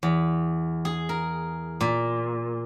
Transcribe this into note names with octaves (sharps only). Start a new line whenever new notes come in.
E2
G#4
A#4
A#2